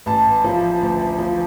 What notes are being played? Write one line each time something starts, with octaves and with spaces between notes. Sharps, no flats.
A1 A5
F3
D2
F3